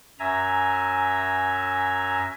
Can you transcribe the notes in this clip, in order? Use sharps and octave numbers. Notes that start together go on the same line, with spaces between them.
F#2 E5 G#5 A#5